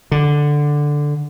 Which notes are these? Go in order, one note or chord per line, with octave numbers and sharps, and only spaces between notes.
D3